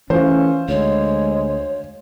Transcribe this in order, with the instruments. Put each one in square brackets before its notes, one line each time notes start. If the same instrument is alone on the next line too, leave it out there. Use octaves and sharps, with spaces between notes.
[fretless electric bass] E3 A3 [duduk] C#4 [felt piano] F4 C5
[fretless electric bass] D2 [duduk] G#3 [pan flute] C#5